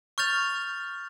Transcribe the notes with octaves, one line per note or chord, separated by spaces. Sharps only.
C#6 F6 G6 A6 F7